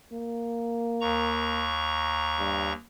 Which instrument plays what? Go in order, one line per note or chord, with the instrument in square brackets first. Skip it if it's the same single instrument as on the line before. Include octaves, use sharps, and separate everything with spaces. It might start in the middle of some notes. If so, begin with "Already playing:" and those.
[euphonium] A#3
[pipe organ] D#2 A#5 C#6
[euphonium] G2